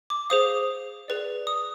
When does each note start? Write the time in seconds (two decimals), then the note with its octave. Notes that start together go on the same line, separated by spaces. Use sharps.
0.10 D6
0.30 G#4 C5 F5 D#6
1.08 G#4 B4 D5
1.47 D#6